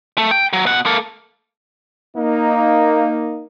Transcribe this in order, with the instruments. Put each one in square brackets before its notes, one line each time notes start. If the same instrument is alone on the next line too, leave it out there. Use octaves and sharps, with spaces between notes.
[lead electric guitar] A3
G5
F#3
B2 F#5
A#3 A4
[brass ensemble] A#3 D#4